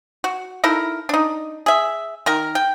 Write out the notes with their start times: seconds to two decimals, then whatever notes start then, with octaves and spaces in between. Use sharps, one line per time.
0.24 F#4
0.64 D#4 E4 A4 A#4
1.09 D4 D#4
1.66 G#4 E5
2.26 D#3 A#4
2.55 G5